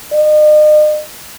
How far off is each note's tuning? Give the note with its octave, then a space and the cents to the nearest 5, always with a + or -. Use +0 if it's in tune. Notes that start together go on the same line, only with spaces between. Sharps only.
D#5 -40